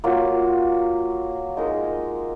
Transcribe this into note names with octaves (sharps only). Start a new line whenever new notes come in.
F#3 A#3 F4
G#3 D#4 A#4